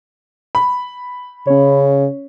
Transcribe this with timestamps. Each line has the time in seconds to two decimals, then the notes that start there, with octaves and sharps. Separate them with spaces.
0.55 B5
1.47 C#3 C#4 C#5